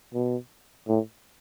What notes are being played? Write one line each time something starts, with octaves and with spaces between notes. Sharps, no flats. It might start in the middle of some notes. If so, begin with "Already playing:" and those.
B2
A2